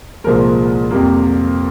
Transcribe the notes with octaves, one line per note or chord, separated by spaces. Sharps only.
C2 A#2 F3 G#3 A#4
F2 C3 G3 A#3